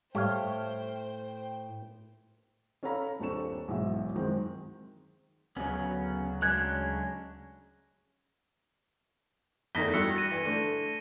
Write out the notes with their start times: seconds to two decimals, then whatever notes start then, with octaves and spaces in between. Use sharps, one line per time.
0.15 A2 G3 A3 C5 C#5 F5 G5
2.83 C#4 A4 C#5 F5 A#5 B5
3.19 D#1 C4 D4 A4 C#6 E7
3.68 B1 G#2 E3 E5
4.15 F#2 D#3 G#3 C4
5.56 D2 C#3 F#3 B3 C#4
6.42 G#3 C#4 D4 F#6 G#6
9.75 E2 D#3 A3 A#6 B6 G7
9.94 G2 F#4 E6 C#7
10.16 A#6 D#7
10.31 E3
10.45 D3 A3 D4